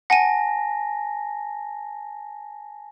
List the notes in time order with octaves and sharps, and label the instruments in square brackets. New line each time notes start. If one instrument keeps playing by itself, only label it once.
[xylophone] F#5 D#7 [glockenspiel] G#5 A5 A#6